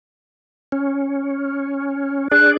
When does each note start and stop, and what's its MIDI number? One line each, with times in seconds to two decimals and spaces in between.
0.72 2.28 61
2.31 2.57 62
2.31 2.57 68
2.31 2.57 74
2.31 2.50 90